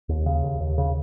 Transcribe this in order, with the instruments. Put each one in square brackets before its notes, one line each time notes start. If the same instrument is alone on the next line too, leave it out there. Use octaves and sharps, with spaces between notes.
[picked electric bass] D#2
C#3
D#2
D#2
C#3